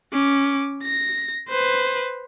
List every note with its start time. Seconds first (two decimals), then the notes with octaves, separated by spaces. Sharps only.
0.13 C#4 D6
0.84 A#6
1.49 B4 C5